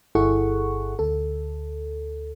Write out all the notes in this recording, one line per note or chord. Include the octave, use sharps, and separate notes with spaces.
G1 E4 G#4 A4 F#5 C#6
D2 A4